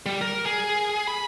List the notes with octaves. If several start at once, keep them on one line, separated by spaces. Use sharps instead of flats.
G3
A#4
G#4
B5